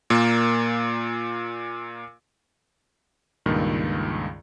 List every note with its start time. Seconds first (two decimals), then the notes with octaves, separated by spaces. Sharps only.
0.10 A#2 A#3
3.46 C#2 G2 A#2 D#3